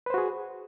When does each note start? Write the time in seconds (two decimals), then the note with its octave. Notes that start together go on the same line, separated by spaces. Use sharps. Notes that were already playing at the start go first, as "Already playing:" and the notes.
0.06 B4
0.10 C5
0.14 F#4
0.18 G#4